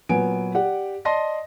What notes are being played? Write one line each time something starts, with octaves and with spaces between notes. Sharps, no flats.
A#2 F#3 B3 G#5 D7
G4 D5 F#5
D5 D#5 A5 C6 A#6